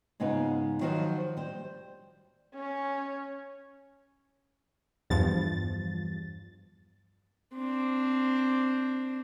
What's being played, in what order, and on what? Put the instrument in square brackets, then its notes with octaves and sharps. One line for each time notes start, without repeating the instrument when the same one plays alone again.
[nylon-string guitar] G#2 C#3 B3 D#4 F4
D#3 F3 F#3 D#4 F#4 C5
G3 C5
[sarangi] C#4
[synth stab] E2 G2 F3 A6
[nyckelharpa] C4 D4